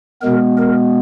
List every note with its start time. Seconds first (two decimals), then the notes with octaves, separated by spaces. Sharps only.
0.22 B2 G#3 B3 A#4
0.58 A#4